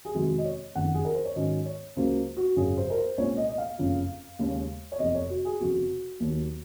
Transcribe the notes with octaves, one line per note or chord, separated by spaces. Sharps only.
G#4
F2 C3 D#3 G#3 F#4
D#5
C#5
F#1 F2 D#3 F#5
G#4
A#4
C5
C#5
G#2 D#3 F#3 C#4 D#5
C#5
C#2 C#3 F#3 A#3 C5
F#4
G#1 F#2 C#3 G#4
C5
A#4
C5
C2 A#2 G#3 C#4 C#5
D#5
D#5
F5
F#1 F2 C#3 F3
D#2 C#3 G#3 C#4
C#5
F1 F2 C3 D#5
C#5
F#4
G#4
F1 F2 C#3 F#4
D#2 D#3 F#3